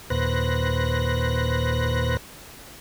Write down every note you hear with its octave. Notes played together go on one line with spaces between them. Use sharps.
D#2 A#2 B4 C5 F#6 A#6